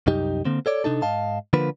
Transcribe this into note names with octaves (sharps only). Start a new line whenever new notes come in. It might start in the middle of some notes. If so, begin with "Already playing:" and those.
C2 F#2 D#4 G4
D3 A#3 C4
A4 C#5 D5
C3 D4 D#4 A4
G#2 D#5 F5 A5
D3 F3 A#3 B4